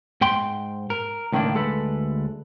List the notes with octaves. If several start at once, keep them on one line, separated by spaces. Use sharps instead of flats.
G#2 G5 C6
A#4
C#2 A2 D#3 A#3 D4
D2 G#3 A4 B4